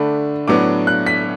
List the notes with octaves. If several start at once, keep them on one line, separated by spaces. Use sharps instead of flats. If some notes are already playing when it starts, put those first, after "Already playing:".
Already playing: D3 A3 D4 B5
A2 F#3 B3 D4 D6
F#6
B6